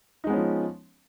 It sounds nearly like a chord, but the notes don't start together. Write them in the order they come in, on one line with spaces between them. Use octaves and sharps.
D#4 G#3 B3 C#4 F3